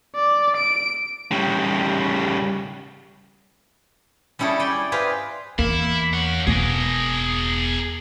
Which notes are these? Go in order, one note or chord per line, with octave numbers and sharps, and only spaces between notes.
D5
D7
C#3 G3
G3 C#4 E4 G#4 A4
D5 G5 G#5
G4 G#4 B4 C5 F5
E2 A#3 E4
C#4 F#5
E1 B3 G#4 A#4